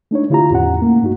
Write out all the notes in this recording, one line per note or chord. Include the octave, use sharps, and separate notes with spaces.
A3 D4 D#4 C#5
D3 E4 F4 G4 A#5
E2 A2 C#4 F#5
A3 A#3
G2 D#4 F#4